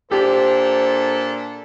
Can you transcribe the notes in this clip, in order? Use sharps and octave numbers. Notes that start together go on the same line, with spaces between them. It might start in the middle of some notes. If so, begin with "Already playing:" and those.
A#2 D4 G4 A4 C5